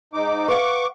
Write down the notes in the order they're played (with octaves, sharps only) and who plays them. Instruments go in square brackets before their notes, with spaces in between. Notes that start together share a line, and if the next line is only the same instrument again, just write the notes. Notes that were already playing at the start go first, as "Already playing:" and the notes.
[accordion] G#2 D#4 D6
[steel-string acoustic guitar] B4 F5 F#5 [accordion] C#6 D6